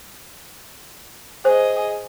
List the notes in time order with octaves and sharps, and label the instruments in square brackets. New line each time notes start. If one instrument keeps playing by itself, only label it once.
[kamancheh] G#4 D#5 [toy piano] C5